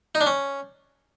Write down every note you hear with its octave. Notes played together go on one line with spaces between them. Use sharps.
D#4
D4
C#4